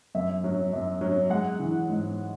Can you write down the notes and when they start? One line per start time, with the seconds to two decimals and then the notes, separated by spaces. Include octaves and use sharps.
0.15 F#2 E5
0.44 F#3
0.73 F#2
1.01 F#3
1.30 G#3 F#5
1.60 E3
1.89 G#2